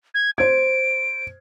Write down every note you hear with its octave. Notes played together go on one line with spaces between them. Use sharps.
G#6
C5 G#6 D7